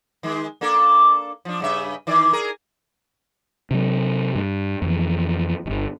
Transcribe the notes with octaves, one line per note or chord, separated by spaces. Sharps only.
D#3 G#3
A#3 D4 A4
F3 D4
G2 C#3 E5
D#3 E3 D5
G#4 A#4
C3 F#3
G2
F2 E3
D1 G1